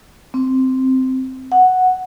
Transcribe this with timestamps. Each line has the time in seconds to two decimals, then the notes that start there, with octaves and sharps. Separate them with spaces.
0.34 C4
1.52 F#5